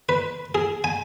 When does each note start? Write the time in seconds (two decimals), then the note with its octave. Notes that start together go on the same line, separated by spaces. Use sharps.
0.09 B4
0.55 G#4
0.84 G#5